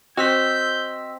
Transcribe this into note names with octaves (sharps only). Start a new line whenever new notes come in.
C4 F#4 D#5 E6 G6 B6